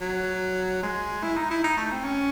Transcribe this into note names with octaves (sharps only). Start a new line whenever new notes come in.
F#3
G#3
E4
D#4
E4
D#4
A3
C4
C#4